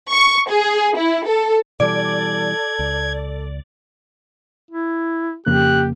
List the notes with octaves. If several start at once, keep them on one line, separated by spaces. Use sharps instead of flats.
C#6
G#4
E4
A4
B2 E3 G3 A4 D5 G#6
C#2
E4
F2 C#3 A#3 G4 F#6